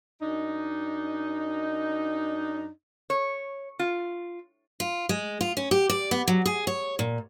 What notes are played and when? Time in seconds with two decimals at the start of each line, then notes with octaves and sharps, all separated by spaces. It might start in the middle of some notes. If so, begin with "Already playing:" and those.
0.22 F#2 D4 D#4
3.10 C#5
3.79 F4
4.80 F4
5.09 G#3
5.41 F4
5.57 C#4
5.71 G4
5.90 D5
6.11 B3
6.28 F#3
6.46 G#4
6.67 C#5
6.99 A#2